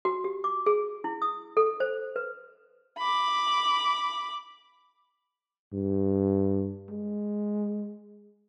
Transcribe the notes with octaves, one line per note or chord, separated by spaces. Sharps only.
F#4
G4
D6
G#4
E4
D#6
A4
C5
B4
B5 D6
G2
G#3